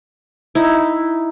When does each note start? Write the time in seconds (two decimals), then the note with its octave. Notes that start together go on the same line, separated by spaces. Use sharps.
0.55 D#4 E4